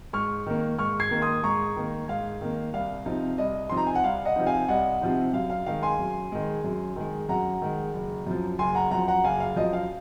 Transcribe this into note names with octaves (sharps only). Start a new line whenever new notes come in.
G#2 C#6 F6
D#3 A#3
G#2 C#6 F6
G#6 C7
D#3 A#3
C6 D#6
G#2 A#5 C#6
D#3 A#3
G#2 F5
D#3 A#3
C2 F5
C3 F3 C4 D#4
C2 D#5
C3 F3 C4 D#4 C6
A#5
G#5
F#5
C2 F5
D#5 F#5
C3 F3 C4 D#4
F5 G#5
C2 D#5 F#5
C3 F3 C4 D#4
F#2 F5
F5
D#3 G#3 F5
G#5 C6
F#2
D#3 G#3
F#2
D#3 G#3
F#2 F#5 A#5
D#3 G#3
F#1
F#2 F3
F#1 G#5 C6
F#5 A#5
F#2 F3 F#5 A#5
F#5 A#5
F#1 F5 G#5
F5
F#2 F3 D#5
F5